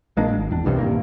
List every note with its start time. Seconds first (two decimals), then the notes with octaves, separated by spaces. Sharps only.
0.17 A#1 G#3 A#3 D4
0.28 G#1
0.51 E2 D4
0.65 E1 C2 G2 C3
0.79 D#1 G2 A#3